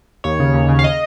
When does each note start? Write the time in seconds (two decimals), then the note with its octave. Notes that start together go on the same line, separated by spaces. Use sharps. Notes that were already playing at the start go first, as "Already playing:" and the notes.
0.24 D#2 C#5
0.40 C#3
0.54 D#2
0.69 C#3
0.79 F5
0.84 D#5